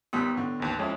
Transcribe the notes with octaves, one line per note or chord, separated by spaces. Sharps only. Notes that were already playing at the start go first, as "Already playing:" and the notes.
D#2 D#3 G3 B3
A2 D3
A1 D#2
F2 G#3 C#4 E4